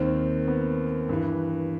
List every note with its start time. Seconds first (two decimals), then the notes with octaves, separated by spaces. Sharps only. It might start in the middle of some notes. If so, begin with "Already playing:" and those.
Already playing: D#2 D#3 C4
0.48 B3
1.09 G2 E3